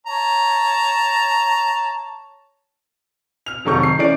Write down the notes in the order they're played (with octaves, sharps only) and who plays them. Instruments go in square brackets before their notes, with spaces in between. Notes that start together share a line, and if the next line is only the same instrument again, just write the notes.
[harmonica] C#5 A5 A#5
[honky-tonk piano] F6 F7
F1 F2 D#3 F#3 C#6 G6
C7
D#3 E3 C#4 D5 D7